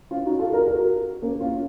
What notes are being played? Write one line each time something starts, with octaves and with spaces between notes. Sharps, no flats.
C#4 F4
D#4 F#4
F4 A4
F#4 A#4
F#4 A#4
A#3 C#4
C#4 F4